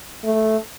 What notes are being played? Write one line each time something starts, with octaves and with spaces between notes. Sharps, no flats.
A3